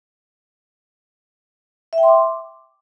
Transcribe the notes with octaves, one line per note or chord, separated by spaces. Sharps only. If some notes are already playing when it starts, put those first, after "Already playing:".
E5
G5
C6
D6